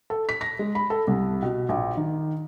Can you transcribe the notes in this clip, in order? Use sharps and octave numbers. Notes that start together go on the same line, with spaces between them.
A4
B6
A#6
G#3
B5
A4
C2
B2
A#1
D#3